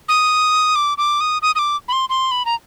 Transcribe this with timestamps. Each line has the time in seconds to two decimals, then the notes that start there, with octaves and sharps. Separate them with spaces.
0.09 D#6
0.75 D6
0.98 D6
1.21 D#6
1.42 D#6
1.55 D#6
1.59 D6
1.88 B5
1.92 C6
2.09 C6
2.31 B5
2.45 A#5